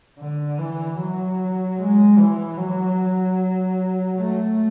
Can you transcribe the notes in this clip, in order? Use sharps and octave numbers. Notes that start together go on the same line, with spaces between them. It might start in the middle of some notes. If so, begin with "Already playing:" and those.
D3
E3
F#3
G#3
E3
F#3
A3